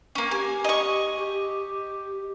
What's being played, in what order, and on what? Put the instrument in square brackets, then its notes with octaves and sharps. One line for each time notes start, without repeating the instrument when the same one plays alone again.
[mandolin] A#3 C#4
[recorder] G4 [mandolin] G#5
[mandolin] D#5 C#6
[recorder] G4